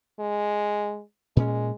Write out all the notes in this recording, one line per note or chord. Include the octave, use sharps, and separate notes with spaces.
G#3
A#2 G#3 C#4